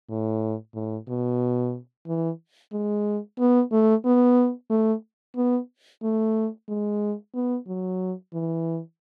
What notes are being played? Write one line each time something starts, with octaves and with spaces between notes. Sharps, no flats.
A2
A2
B2
E3
G#3
B3
A3
B3
A3
B3
A3
G#3
B3
F#3
E3